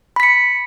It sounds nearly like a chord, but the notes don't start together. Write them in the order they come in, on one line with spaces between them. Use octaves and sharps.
B5 B6 C#7